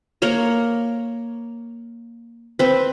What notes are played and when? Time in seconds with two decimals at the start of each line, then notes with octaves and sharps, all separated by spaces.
0.22 A#3 A#4 C#5 A#5
2.59 C4 B4